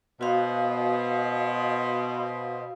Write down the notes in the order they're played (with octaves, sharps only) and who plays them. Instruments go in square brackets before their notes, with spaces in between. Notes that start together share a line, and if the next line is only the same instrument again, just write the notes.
[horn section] B2 C5 D#5 [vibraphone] F#4 F5